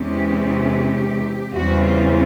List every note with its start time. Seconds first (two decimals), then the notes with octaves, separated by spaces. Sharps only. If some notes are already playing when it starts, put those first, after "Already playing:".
Already playing: E2 C3 E3 G#3 C#4 G4
1.54 E2 C#3 E3 G3 C4 F#4
1.83 F4